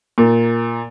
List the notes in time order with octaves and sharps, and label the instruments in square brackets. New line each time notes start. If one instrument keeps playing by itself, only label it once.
[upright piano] A#2